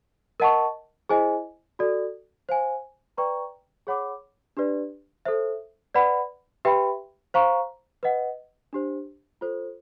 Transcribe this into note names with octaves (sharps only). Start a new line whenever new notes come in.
A#4 D#5 F#5 A5 C#6
E4 G#4 C5 D#5 G#5
F#4 A4 D5
C5 F5 G#5
B4 D5 G5 A#5 C#6
G#4 C#5 F#5 B5 D6
D4 G4 B4 D5
A4 C5 E5
B4 D5 F#5 B5
G4 B4 E5 G5 B5
C5 F5 A#5 C#6
B4 D#5 F#5
D4 G4 C5
F4 A4 C5